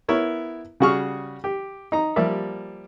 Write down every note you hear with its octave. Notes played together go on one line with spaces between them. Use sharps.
B3 E4 A#4 C#5
C#3 G3 F#4 G#4 C#6 F6
G4
D#4 A#5
F3 G3 A#3 D5 E5